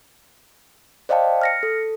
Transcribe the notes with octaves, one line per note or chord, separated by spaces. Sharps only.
C5 D5 D#5 F5 G5 A5
F6 A#6 C#7
A4